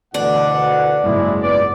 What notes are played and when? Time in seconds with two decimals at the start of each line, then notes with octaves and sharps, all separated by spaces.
0.14 D2 B2 E3 D4 F#5
1.03 F#1 G#2 G#3 E4
1.41 C#2 B3 D5